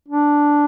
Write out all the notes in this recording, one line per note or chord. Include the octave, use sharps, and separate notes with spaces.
D4